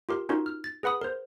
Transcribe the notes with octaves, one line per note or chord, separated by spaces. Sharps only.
F4 G4 A#4
C#4 D#4 F4 F#4 A#4
F6
A6
G#4 B4 F#5 B5 D#6
A#4 C5